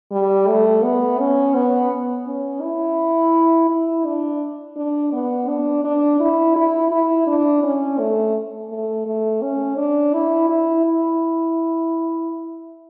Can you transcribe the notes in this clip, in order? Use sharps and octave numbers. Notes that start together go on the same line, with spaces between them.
G3
A3
B3
C#4
B3
C#4
E4
E4
D4
D4
B3
D4
D4
E4
E4
E4
D4
C#4
A3
A3
A3
C#4
D4
E4
E4
E4